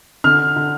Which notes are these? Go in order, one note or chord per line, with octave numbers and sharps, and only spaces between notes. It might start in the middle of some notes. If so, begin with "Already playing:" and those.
D3 F6
D3